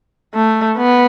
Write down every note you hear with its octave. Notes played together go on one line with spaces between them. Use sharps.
A3
B3